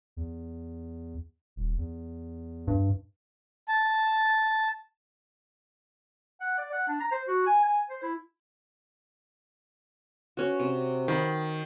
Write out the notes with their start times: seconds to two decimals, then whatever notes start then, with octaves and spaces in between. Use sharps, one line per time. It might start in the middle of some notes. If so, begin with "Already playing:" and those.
0.17 E2
1.56 D#1
1.78 E2
2.68 G2
3.68 A5
6.41 F#5
6.58 D5
6.72 F#5
6.88 D4
7.00 A#5
7.12 C5
7.28 F#4
7.46 G#5
7.65 G#5
7.90 C5
8.03 E4
10.37 C#4 F#4
10.60 C3
11.08 D#3 B5